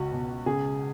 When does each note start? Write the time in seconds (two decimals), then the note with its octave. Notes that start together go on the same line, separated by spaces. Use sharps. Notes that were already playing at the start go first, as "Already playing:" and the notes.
Already playing: C#2 F#4
0.12 B2
0.46 C#3 G#4